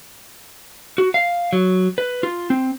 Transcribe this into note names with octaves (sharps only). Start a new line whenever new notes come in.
F#4
F5
F#3
B4
F4
C4